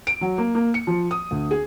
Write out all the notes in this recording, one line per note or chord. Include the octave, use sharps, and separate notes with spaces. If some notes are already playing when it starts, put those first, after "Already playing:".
D7
F#3
A#3
A#3
C#7
F3
D#6
D2
G#4